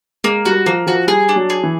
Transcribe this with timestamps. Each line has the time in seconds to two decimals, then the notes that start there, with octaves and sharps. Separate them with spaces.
0.24 G#3 A#3
0.46 G3 F#4
0.66 F3 A#3
0.87 F3 F#4
1.07 G3 G#4
1.29 D4
1.36 F#3
1.50 G#4
1.63 E3